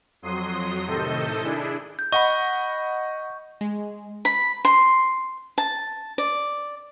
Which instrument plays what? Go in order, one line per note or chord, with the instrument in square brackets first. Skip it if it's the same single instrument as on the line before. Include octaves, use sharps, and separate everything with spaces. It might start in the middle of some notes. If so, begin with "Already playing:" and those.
[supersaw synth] F2 F#3 C6 D#6
A2 C3 D#3 A4 D#5 G6
D4 E4 G#4
[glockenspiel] G6
[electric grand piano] D#5 F#5 B5 [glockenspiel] C#6
[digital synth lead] G#3
[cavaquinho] B5
C6
A5
D5